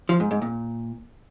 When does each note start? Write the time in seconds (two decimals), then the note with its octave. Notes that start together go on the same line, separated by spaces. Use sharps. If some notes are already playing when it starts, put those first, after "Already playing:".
0.09 F3
0.20 G#2
0.31 G#2
0.42 A#2